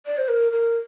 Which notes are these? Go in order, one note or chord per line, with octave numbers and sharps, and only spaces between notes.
D5
C5
A#4
A#4